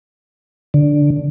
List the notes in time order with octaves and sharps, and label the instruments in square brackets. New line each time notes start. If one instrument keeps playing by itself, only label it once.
[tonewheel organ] D3